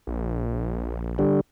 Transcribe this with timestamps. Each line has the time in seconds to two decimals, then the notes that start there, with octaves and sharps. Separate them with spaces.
0.07 A#1
1.19 D3 G3